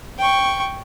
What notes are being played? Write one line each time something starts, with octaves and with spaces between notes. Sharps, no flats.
G5 C#6